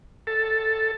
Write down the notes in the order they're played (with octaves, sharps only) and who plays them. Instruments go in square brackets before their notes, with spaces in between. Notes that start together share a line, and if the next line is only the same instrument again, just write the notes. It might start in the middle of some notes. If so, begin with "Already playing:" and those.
[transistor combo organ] A4